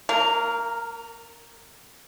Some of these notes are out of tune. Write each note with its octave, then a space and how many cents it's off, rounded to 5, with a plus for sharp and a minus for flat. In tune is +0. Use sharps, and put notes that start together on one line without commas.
A#3 -35 A#4 +0